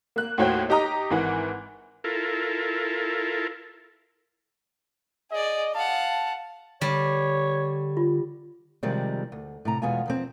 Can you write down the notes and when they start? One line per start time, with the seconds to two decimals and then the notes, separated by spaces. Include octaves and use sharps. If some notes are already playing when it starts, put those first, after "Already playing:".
0.16 A#3 F#6
0.38 D#2 A2 F#4 C5 C#5 G5
0.69 D#4 G4 D#5 A#5 D#6
1.10 G#1 E3 F#5
2.04 E4 F4 A4 A#4
5.32 G#4 D5 D#5
5.75 F5 F#5 A5
6.81 D3 G3 C#5
7.97 F4
8.83 C3 D#3 F3 G3 G#3 C4
9.32 D2
9.65 A2 C3 A#5
9.82 E2 B2 G#3 B3 F4 G#5
10.06 E2 F3 C4